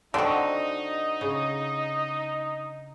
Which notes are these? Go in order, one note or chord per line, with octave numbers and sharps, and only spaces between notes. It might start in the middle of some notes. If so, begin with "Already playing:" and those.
D3 C4 D#4 F#4 D#5
C#3